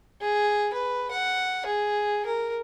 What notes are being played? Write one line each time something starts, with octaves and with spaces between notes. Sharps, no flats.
G#4
B4
F#5
G#4
A#4